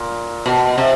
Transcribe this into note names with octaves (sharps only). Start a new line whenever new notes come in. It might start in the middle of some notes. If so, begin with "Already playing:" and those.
Already playing: A#2
B2
C3